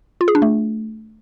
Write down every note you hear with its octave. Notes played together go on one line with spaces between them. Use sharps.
F4
G#4
D4
A3